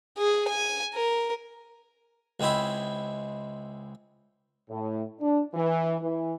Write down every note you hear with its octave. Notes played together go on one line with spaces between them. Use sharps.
G#4
G#5
A#4
C#2 G#3 C4 E4 B5
A2
D4
E3
E3